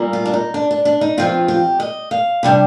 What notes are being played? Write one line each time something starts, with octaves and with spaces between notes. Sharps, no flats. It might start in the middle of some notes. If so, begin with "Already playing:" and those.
Already playing: A#2 G3 A#3
F4
D4
D#4
D4
D4
D4
D#4
G2 F3 C4 F4
G4
D#5
F5
C3 G3 D4